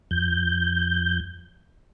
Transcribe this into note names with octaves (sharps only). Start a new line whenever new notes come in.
F2 G6